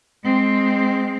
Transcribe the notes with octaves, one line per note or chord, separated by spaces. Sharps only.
G#3 C4